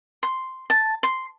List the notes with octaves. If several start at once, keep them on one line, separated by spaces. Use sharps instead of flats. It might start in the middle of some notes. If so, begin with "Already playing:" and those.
C6
A5
C6